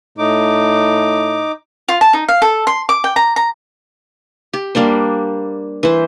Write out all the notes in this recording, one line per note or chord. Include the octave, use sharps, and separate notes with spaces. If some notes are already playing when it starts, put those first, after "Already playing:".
A2 D#4 D6
F4
A5
D#4
F5
A4
C6
D6
G5
A#5
A#5
G4
G3 A#3 D4 C5
E3 C5